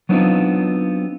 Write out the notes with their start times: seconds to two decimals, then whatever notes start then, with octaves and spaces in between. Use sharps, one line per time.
0.09 F#3 B3 C4 D4 D#4 F4